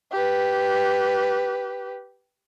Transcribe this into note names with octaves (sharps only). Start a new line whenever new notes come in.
G4 B4